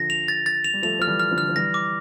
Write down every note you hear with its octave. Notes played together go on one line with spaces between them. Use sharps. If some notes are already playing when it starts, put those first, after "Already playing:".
Already playing: D3 F3 A#6
F7
A6
A6
F7
G3
F3 A3 F7
F3 F6
E3 G3
F6
D3 F3
F6
F3
E3 G3 A#6
D6